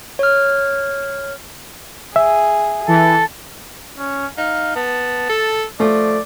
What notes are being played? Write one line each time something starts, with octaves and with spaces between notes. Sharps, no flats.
C#5 F6
G#4 E5
E3 A4
C#4
D#4 F5
B3 A5
A4
F3 A3 D5